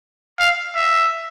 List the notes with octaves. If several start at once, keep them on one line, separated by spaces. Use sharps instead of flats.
F5
E5